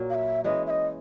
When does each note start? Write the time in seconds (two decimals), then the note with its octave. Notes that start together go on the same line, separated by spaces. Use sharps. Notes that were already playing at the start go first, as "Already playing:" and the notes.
Already playing: A#2 F#3 A#3
0.10 F5
0.14 E5
0.44 E3 G#3 C#4 D#5
0.67 E5
0.70 D#5